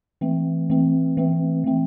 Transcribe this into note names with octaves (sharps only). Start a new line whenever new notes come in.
E3 A3 C4
E3 A3 C4
E3 A3 C4
E3 A3 C4